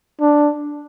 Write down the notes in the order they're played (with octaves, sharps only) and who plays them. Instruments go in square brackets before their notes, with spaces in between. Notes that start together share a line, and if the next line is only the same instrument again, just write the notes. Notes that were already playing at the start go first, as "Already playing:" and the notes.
[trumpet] D4